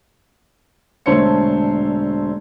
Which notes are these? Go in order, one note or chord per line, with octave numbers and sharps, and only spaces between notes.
E1 D3 A3 C5 C#5 C#7